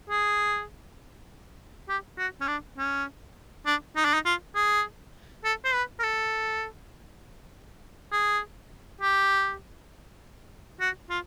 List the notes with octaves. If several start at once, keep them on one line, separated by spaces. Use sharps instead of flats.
G#4
G4
F#4
C#4
D4
C#4
D4
D#4
D4
D#4
F4
G#4
A4
C5
B4
A#4
A4
G#4
G4
F#4
F4